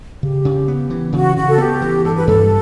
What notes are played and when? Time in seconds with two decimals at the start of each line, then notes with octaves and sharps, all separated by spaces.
0.22 C#3 G4
0.45 C#3
0.68 B3
0.90 E3
1.13 C#3 F#4
1.36 C#3 F#4
1.50 A4
1.58 B3 G4
1.82 E3
2.04 G2 A4
2.15 B4
2.27 G2 A4